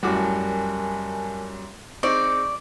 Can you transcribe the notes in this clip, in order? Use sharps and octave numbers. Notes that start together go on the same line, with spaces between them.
F#2 A2 G3 F#4 A#4 G#5 A5 D6
C4 D#4 G#4 D5 C#6